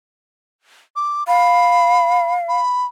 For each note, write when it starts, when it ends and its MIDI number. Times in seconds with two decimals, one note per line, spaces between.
0.96 1.24 86
1.27 2.58 77
1.27 2.33 83
2.49 2.86 83